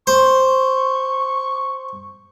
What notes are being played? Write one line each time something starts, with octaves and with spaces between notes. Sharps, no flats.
C5 C#6